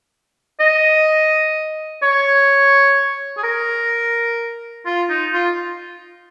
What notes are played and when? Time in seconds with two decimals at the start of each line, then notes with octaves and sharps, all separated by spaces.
0.60 D#5
2.02 C#5
3.37 G#4
3.43 A#4
4.86 F4
5.09 D#4
5.33 F4